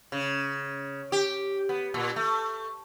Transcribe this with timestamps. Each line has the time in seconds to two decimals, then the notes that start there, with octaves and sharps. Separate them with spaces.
0.12 C#3
1.12 G4
1.69 B3
1.94 A#2
2.16 A3